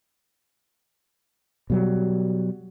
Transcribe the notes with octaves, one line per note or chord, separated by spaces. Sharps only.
B2 F#3 G3